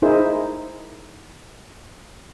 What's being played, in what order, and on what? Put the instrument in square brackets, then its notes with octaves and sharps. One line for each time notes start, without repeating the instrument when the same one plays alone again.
[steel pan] D#4 E4 G#4 A#4 C5